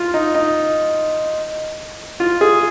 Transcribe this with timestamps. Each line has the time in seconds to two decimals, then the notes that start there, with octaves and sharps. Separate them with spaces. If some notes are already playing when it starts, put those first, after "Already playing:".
Already playing: F4
0.14 D#4
0.35 D#4
2.20 F4
2.41 G#4